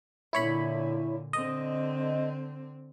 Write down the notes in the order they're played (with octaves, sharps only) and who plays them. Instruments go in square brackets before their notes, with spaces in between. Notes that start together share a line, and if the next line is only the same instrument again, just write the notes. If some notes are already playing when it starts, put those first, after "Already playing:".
[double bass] A#2 D3 [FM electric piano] E4 C#5 B5
[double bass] D3 C4 [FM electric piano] D#5